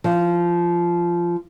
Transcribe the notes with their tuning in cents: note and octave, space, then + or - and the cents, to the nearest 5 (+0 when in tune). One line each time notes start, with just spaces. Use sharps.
F3 -15